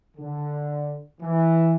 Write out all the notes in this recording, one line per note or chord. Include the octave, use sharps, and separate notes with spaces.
D3
E3